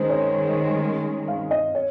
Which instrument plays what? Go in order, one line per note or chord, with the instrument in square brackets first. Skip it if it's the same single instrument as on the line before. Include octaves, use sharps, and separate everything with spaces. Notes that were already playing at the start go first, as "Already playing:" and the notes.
Already playing: [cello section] D#3 G#3 C#4 [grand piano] C5
[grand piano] C#5
F5
D#5
C#5